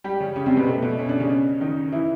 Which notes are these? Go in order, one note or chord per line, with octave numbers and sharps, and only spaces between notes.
G3 G4
C#3 C#4
C#3 C#4
C3 C4
B2 B3
A3
B2 B3
C#4
D4
C#3 C#4
D#3 D#4
E3 E4